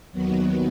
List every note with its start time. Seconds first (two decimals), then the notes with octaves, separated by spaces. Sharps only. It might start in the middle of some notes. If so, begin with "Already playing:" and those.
0.12 D#2 D#3 F#3 B3 F#4